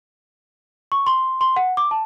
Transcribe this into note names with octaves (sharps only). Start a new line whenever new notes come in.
C#6
C6
C6
F#5
D6
A5